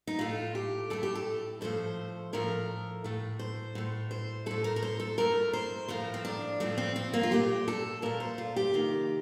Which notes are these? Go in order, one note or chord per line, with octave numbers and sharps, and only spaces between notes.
D#4
A2 A3 F4
G4
A2 A3 A4
G4
A4
A2 F3 A3 C5
A2 F3 A3 A#4
A2 A3
C5
A2 A3
C5
A2 A3 A4
A#4
A#4
C5
A4
A2 A3 A#4
C5
A2 F3 A3 A#4
C4
D4
A2 F3 A3 C4
C4
C4
A#3
F4
A#2 A3 G4
A4
A#2 A3 A#4
C5
F4
G4
C3 D#3 A#3